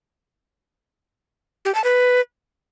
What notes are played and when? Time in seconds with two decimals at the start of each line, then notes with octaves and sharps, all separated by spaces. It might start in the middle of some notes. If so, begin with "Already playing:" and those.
1.65 G4
1.75 A5
1.84 B4